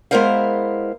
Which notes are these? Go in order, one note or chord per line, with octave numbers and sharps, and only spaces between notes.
G#3 B3 E4 A#4 C5 F5